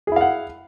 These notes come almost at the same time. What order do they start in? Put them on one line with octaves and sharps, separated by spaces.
G#4 E4 F5 F#5